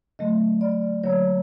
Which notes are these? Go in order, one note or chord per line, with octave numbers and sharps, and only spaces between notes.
D3 F#3 A3 D#5
D5
D3 F#3 A#3 C#5